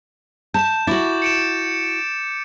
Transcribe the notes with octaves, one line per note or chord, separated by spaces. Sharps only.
A5 G6 E7
E4 F#4 D6 A6
C#7 D7 E7